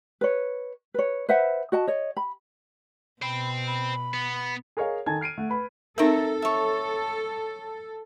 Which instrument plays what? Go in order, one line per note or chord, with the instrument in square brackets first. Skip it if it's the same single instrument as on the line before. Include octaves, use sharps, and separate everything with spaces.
[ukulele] B4 C#5
B4 C#5
B4 C5 E5 F#5
F#4 D#5 A5
C#5 D#5
B5
[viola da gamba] B2 [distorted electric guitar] C5 G5 [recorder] B5
[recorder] B5
[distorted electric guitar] B3
[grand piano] G#4 A#4 C#5 D#5 F5
D#3 A4 G#5 A5 G#6
F6 C7 D7 D#7
A3 F#5
B4 B5
[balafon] C4 D#4 A#4 [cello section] A4 [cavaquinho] E5 A#5
[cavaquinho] C#5 E5